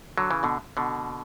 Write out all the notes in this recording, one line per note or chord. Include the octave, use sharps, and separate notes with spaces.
D3 F#3
C#3 E3
B2 D3
B2 D3